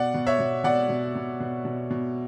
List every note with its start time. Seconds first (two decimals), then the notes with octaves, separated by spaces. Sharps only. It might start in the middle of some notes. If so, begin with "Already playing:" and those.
Already playing: B2 D5 F#5
0.14 B2
0.27 C#5 E5
0.39 B2
0.64 B2 D5 F#5
0.89 B2
1.15 B2
1.40 B2
1.65 B2
1.90 B2